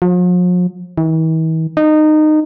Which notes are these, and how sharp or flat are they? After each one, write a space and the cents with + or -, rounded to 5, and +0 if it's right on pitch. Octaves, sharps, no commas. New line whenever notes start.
F3 +45
E3 -45
D#4 -20